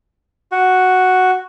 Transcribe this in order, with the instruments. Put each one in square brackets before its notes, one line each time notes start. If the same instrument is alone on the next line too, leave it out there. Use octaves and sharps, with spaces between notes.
[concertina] F#4